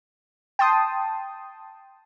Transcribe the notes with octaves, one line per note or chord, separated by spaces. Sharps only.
G5 A5 C6 D#6